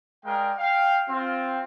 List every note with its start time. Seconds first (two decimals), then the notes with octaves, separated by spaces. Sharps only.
0.25 G#3 A#4 D5 F5 G5
0.57 F5 G5
1.09 C4 F4